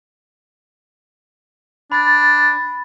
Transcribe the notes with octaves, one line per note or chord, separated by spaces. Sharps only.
D4 B5 A6